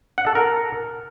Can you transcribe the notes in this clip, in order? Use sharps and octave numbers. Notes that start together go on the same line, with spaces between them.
F#5
A4
A#4